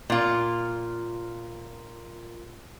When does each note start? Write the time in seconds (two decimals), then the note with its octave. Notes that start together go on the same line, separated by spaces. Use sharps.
0.10 A#2 F4